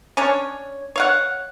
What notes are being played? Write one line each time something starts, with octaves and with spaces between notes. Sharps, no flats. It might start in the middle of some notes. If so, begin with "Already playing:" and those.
C#4 D4 C#5
C#5 F5 F#5